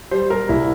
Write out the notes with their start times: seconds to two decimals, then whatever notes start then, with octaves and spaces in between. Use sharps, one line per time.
0.11 G3 C5
0.30 G3 A#4
0.49 C2 E4